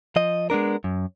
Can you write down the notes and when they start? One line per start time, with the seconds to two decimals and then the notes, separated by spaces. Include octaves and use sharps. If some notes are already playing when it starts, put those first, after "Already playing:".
0.16 F3 D#5
0.50 G#3 B3 D4 A#4
0.84 F#2